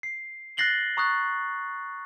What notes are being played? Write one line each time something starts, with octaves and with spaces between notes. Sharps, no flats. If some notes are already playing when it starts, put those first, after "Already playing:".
C7
F#6 A6 A#6 C7 F#7 G7
A#5 C#6 D#6 F#6 A6